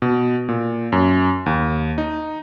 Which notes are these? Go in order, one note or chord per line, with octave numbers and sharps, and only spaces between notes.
B2
A#2
F#2
D#2
D#4